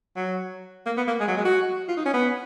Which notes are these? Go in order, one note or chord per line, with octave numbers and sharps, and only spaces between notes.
F#3
A#3
B3
A#3
G#3
F#3
G#3
F#4
F4
D#4
C#4
B3